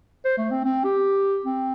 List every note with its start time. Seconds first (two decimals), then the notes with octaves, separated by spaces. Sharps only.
0.25 C5
0.38 A3
0.51 C4
0.64 C4
0.84 G4
1.45 C4